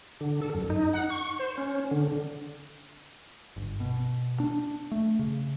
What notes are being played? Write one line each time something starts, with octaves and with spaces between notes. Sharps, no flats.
D3
A4
F#2
D#4
F#5
C#6
C5
C#4
D3
G1
B2
D4
A3
C#3